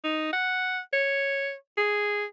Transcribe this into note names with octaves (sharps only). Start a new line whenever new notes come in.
D#4
F#5
C#5
G#4